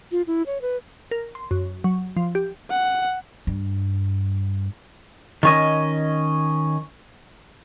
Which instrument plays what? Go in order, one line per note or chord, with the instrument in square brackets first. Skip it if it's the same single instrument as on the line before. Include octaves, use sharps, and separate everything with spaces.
[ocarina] F4
E4
C#5
B4
[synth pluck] A#4
C6
F#2
F#3
F3
G4
[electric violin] F#5
[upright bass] G2
[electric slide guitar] D#3 C#4 D#5